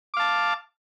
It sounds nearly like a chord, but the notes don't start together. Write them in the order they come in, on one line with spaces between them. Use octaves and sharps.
D6 F5 A5